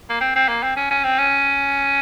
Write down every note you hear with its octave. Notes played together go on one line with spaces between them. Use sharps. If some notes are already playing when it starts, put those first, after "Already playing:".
A#3
C4
C4
A#3
C4
C#4
C#4
C4
C#4